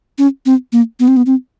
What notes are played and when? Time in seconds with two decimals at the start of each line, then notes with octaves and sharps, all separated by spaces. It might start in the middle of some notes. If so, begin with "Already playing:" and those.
0.18 C#4
0.46 C4
0.73 A#3
1.00 B3
1.08 C4
1.17 B3
1.26 C4